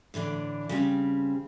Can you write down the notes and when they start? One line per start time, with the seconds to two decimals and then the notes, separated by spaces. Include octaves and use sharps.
0.14 A2 D3 E3 D4
0.69 C#3 G3 C4